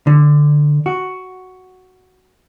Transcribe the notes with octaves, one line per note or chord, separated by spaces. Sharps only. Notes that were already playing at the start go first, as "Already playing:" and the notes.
D3
F#4